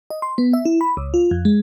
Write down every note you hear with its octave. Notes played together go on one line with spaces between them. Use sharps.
D#5
C6
B3
E5
E4
B5
C#2
F4
F2
G#3